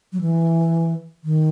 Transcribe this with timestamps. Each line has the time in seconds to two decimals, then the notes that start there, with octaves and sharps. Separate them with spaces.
0.13 F#3
0.21 E3
1.24 D#3